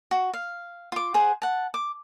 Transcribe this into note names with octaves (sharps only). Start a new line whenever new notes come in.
F#4
F5
F4 D6
G#4 C5 F#5
F#5 A5
D6